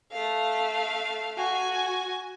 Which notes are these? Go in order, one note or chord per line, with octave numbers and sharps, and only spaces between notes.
A3 F5
F#4 G#5